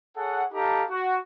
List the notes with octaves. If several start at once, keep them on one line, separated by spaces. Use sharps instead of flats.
G#4 A4 C#5 F#5
D#4 G4 A4 F5 A5 A#5
F#4